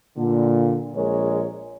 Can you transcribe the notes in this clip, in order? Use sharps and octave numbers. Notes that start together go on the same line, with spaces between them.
A#2 D3
A#1 G#3 A#4 C#5